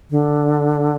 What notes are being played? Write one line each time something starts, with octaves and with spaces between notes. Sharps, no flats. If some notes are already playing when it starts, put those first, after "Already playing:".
D3